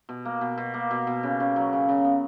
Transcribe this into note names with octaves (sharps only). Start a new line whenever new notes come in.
B2
A#3
B2
B2
A#3
B2
B2
C#3
C#3
F#3
C#3
C#3
B3